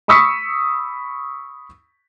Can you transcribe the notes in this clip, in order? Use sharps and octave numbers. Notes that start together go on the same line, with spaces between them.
B5 C#6 D#6 E6 B6 C#7